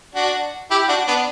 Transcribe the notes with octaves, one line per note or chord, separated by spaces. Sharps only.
D4 F#4
E4 G4
D4 F#4
B3 D4